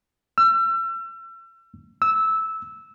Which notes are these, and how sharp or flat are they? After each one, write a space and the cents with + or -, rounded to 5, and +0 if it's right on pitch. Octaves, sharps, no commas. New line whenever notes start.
E6 +35
E6 -15